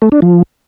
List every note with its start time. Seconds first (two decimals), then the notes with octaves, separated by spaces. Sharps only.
0.02 A3
0.12 D4
0.22 F3